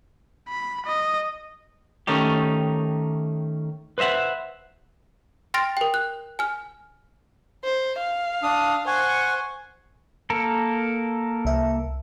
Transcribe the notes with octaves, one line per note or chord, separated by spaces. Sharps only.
B5
D#5
D#3 A3 C#4 D#4 G4
B4 C5 D#5 E5 F#5
G5 C6 F6 A6 A#6 D7
A#4 G5
F#6
G#5 F6
C5
F5
D4 D#6
C5 F#5 G#5 C#6
A#3 A4 A#4
C2 E5